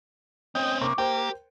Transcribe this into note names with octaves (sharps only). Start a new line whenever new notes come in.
C4 C#4 D#5 G5
C3 A#3 C#6 D6
A#3 G4 A#4 C5 G5